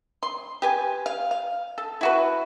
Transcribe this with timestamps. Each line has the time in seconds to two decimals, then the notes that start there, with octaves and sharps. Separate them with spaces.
0.23 C6
0.62 G4 B4 G#5
1.06 F5
1.31 F5
1.78 A4
2.01 E4 F#4 B4